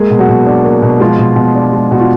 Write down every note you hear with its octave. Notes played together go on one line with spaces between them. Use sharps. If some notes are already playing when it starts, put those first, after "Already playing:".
Already playing: G#3 A#3 G#4
B2
F#3 F#4
B2
D4
A#3
B2
F3 G#3 F4
B2
B2
D4
G#3
B2 F#4
F4